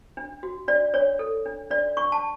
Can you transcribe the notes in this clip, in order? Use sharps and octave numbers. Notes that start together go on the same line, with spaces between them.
D4
F#4
D4 D5
D4 C#5
A4
D4
D4 D5
D4 C#6
A5